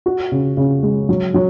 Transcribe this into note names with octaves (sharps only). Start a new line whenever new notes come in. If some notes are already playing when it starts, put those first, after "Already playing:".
F#4
C#3
C#3
G#3
F#3
F#3